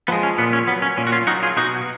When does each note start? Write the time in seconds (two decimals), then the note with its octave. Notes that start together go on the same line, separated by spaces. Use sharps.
0.08 F3 G#3 B3
0.23 C#4
0.38 A#2 B3
0.53 C#4
0.67 F#3 B3
0.82 C#4
0.97 A#2 C#4
1.07 F#4
1.12 C#4 F4
1.27 F#3 D#4 F#4
1.43 F4 G#4
1.57 B2 D#4 F#4